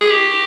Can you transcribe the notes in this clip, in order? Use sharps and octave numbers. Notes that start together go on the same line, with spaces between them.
G#4
G4